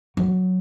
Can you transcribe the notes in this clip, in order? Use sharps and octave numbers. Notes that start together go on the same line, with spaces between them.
F#3